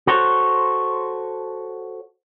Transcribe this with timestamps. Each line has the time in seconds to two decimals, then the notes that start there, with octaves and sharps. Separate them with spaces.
0.07 F#4 A4 C5 C#5